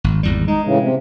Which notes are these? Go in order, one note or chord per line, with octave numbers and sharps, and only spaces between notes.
G#1
G#1 E2 G3
G#3 D#4
A2 C#3 E3
C3